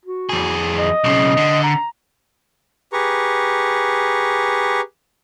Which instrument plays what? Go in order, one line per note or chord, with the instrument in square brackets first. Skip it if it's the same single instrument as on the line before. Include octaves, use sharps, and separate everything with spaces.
[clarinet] F#4
[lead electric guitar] F2 G#4
[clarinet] D#5
[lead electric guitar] B1 C#3
D3
[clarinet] A#5
[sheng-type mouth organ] G4 G#4 B4 A#5 C#6